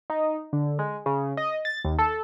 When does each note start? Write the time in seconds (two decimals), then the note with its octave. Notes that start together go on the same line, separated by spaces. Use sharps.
0.10 D#4
0.53 D3
0.79 G#3
1.06 C#3
1.37 D#5
1.65 A6
1.85 D#2
1.99 A4